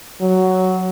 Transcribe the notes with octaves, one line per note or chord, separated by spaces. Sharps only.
F#3